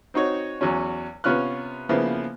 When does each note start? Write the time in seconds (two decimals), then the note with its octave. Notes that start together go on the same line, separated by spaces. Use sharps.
0.14 C4 D#4 F#4 C#5
0.61 E2 F#3 C#4
1.24 C3 B3 C#4 F4 F6 F#6
1.89 C#3 F3 A#3 B3 E4